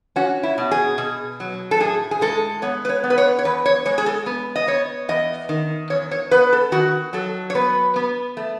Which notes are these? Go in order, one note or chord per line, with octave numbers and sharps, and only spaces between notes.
C#4 F#4
E4
B2
G#4
B2
F#3
A4
A2 G#4
G#4
G#3 A4
B3 C#5
B4
C#5
B3
B4
C#5
C#5
E2 B4
C#5
G#3 C#5
G#4
A4
B3
D#5
B3 C#5
E2 D#5
D#3
E2 C#5
C#5
B3 B4
A4
D#3 F#4
F#3 A4
C#5
B3 B4
B3
A3